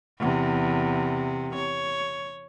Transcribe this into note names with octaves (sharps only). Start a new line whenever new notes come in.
E2 C3
C#5